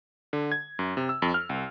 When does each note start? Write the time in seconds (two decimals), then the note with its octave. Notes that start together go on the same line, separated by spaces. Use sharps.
0.33 D3
0.52 G#6
0.79 F#2
0.97 C3
1.09 E6
1.22 F2
1.34 F6
1.49 C2